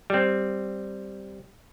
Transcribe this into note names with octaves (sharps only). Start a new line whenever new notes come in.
G3 C4